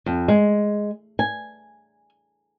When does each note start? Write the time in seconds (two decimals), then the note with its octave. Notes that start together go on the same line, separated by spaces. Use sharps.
0.06 F2
0.28 G#3
1.19 G#5